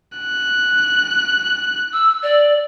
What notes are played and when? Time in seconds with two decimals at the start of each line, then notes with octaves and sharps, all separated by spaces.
0.18 F#6
1.93 E6
2.23 D5